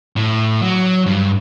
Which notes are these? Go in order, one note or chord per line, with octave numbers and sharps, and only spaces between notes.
A2
F#3
G2